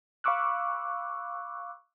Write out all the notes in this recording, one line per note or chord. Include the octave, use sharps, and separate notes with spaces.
F5 B5 C#6 D6 E6 F#6